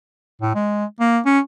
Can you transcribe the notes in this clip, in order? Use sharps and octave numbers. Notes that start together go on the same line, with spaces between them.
A2
G#3
A#3
C#4